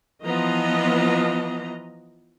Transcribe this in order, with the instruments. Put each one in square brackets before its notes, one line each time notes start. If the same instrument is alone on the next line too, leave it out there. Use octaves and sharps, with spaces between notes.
[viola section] E3 F3 B3 D#5 A#5